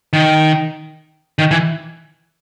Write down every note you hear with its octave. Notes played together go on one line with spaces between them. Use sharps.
D#3
D#3
E3